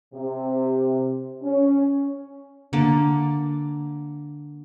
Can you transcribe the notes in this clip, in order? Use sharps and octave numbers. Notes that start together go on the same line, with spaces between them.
C3
C#4
D3 A#3 A5